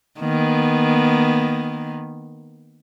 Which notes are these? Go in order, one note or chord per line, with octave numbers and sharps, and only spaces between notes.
D#3 A#3 B3